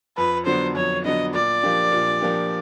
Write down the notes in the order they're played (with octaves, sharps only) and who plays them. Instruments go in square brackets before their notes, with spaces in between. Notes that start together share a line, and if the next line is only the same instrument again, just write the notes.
[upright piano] F2 [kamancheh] B4
[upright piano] D3 F#3 B3 D4 [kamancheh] C5
[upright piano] F2 [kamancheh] C#5
[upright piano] D3 F#3 B3 D4 [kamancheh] D#5
[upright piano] A#2 [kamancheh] D5
[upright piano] F3 A#3 D4 G4
A#2
F3 A#3 D4 G4